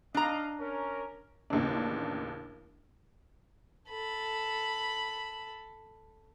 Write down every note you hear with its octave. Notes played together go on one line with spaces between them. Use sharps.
D4 D#4 D#5 F5 A#5
C#4 A#4
A1 D#2 C#3 D4
A4 B5